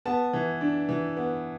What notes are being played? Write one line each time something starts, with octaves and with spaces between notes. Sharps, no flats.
B3 A5
E3
D4
E3
B3